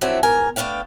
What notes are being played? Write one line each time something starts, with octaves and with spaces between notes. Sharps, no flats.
F3 F#3 C4 D4 E4 A4
E2 G#2 A#4 G#5
A3 B3 D4 F5 G5